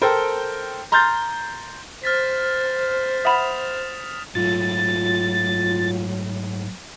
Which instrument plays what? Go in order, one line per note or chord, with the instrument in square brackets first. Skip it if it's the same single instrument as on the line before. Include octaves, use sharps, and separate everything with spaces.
[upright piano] A4 A#4 C5 G5
A#5 C6 F6 G6 A6
[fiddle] C5 [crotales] F6 A6 B6
[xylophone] E5 F#5 B5 [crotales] D#6 E7 F7
[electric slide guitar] G#2 A3 [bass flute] F#3 [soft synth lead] F4 [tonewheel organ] A6